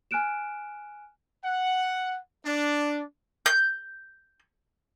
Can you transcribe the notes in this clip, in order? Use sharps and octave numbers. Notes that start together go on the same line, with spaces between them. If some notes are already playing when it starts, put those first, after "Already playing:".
G#5 F6 F#6 D7 E7
F#5
D4
G6